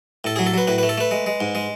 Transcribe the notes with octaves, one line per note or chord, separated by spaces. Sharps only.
A2 A4
G#4
F#3
A4
F#3 B4
A2 B4
B4
A3
A4
A3 B4
G#3
G#3
G#2
G#3